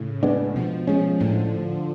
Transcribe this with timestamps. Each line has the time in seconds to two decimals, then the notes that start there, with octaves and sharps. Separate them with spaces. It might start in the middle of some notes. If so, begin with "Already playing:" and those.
Already playing: A2 C#3
0.23 G#3 B3 D4
0.56 B2 F3
0.87 F3 G#3 C#4
1.20 A2 D3